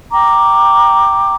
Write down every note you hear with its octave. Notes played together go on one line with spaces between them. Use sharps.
G5 A#5 D6